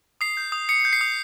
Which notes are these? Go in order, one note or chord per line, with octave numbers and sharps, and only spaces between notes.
D#6 C7
G6
D#6
D#6 C#7
G6
C7
D#6